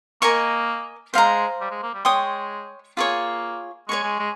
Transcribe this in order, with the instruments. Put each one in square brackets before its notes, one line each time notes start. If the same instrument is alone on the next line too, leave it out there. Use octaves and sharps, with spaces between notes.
[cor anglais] A#3 [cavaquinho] A#4 D#5 G#5 C#6
[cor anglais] G#3 [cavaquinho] C5 F5 A#5
[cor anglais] G3
G#3
A#3
G3
[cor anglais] G#3 [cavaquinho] C#5 G5 C6 D#6
[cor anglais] A#3 [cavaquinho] F4 G#4 C#5
[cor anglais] G#3 [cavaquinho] C#5 G#5 C#6
[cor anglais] G#3
G#3